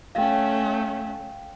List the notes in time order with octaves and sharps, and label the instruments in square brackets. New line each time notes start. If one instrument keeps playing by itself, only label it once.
[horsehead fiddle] A3 C#4 [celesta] F5 G5